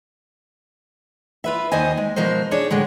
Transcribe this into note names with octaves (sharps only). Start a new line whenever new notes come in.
F4 B4 E5
D#2 D#3 C5 D#5 G#5
G#3
B2 F3 G#3 A#4 C5
D4 G#4 C#5
A2 D3 F#3 G#3